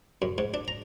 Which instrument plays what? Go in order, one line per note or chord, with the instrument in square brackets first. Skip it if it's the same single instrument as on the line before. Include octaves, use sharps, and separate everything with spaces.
[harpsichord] F#2
G#2
D4
A#5